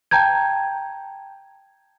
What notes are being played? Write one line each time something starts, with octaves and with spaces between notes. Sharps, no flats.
G5 A5 A#5 G6 G#6